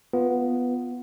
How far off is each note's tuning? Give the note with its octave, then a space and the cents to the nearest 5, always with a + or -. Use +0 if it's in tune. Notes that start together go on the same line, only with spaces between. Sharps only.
B3 +0 F4 +0